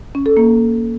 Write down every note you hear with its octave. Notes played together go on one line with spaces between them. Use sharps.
C#4
A4
A#3